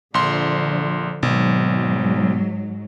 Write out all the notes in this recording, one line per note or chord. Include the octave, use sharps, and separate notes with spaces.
A#1 D3 F3 C6
G#1 G#2 B2 F#3